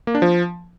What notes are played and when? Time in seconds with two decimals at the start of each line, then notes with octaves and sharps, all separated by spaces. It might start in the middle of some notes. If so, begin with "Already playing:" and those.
0.07 A#3
0.15 D4
0.22 F3